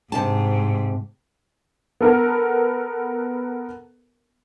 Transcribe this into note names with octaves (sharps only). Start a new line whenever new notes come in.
G#2 C3 A5
B3 A4 A#4